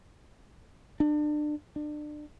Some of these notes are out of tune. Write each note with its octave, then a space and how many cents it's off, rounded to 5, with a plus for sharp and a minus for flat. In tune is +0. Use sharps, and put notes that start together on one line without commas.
D4 +30
D4 +30